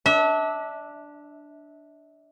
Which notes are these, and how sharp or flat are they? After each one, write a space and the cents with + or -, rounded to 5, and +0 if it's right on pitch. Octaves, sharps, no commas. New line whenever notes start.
D4 +0 E5 -35